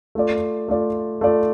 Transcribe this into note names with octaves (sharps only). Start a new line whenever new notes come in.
A3 F4 D5
A3 F4 D5
A3 F4 D5